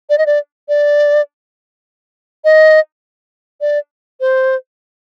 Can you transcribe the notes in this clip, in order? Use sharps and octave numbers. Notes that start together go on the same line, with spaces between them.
D5
D#5
D5
D5
D#5
D5
C5